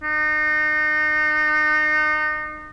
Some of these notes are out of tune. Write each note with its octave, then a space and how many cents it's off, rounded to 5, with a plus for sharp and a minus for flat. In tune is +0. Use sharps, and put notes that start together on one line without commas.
D#4 -30